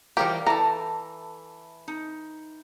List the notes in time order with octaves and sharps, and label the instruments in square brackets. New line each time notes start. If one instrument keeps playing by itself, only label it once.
[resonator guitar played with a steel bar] E3 G3 A#4 [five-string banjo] F3 G4
[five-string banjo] E3 A#5 [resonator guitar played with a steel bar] A4 A5
[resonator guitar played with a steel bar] D#4